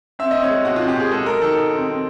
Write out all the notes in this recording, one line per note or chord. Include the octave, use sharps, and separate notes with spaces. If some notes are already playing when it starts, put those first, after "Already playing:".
C4 E5
C4 D#5
C#5
G#3
B2 F#4
C4 F4
G4
B2 G#4
G#3 A4
G#3 A#4
D#3 A4
D#3
C4
C4